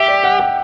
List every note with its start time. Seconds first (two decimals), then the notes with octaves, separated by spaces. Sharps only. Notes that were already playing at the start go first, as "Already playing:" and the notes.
Already playing: G4 E5
0.08 D5
0.24 F#5
0.40 G5